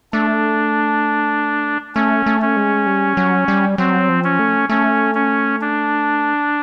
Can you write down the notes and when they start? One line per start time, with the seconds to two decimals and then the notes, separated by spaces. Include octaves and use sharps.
0.13 A3 D4
1.95 A3 C#4
2.26 A3
2.42 C#4
2.56 G#3
2.86 G3
3.17 F#3
3.48 G3
3.78 F#3 C4
4.09 F3
4.24 C#4
4.39 A3
4.69 A3 C#4
5.15 C#4
5.61 D4